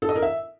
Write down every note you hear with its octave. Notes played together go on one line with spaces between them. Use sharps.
A4
D#5
A#4
E5